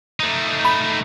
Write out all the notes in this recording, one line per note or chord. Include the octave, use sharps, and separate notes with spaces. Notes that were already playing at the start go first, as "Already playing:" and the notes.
A3 D#4
B5